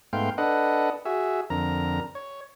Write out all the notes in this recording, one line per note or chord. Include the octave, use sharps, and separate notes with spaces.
G#2 A3 B3 F5 G5 C6
D4 A4 B4 D#5 F#5
F#4 G#4 E5
F2 D3 A#4 A#5
C#5